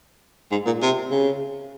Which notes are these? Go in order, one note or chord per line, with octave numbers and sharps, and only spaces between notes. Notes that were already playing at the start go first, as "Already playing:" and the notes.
G#2
A#2
C3
C#3